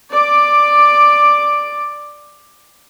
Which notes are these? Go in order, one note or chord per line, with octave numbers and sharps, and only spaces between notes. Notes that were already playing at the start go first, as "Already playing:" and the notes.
D5 D6